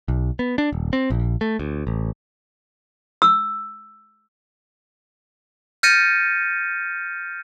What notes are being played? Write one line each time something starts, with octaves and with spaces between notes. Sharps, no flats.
B1
B3
D4
D#1
C4
A#1
A3
D2
A1
E6
F6 G6 A6 A#6 C#7 D#7